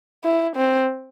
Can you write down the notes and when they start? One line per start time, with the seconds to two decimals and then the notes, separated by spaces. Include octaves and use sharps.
0.24 E4
0.56 C4